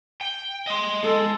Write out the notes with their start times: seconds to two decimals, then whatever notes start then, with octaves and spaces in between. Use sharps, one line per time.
0.21 G5
0.67 D#5 C6
1.04 G#3 A4